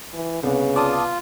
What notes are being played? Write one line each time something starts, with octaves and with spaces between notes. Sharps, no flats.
E3
C2 C#3 B3
F4 D5 A5 D#6